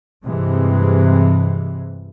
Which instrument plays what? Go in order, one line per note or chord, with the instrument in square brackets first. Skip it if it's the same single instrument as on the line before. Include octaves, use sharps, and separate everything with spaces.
[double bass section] G2 C3 E3 G#3 C4